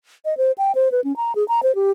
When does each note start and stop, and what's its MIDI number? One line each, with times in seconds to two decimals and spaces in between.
0.25 0.37 75
0.37 0.52 72
0.58 0.72 79
0.75 0.91 72
0.92 1.00 71
1.04 1.15 61
1.16 1.32 82
1.35 1.46 68
1.48 1.60 82
1.63 1.75 72
1.75 1.91 67